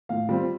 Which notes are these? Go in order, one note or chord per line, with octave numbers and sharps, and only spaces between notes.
A2 F5
G3 C4 F4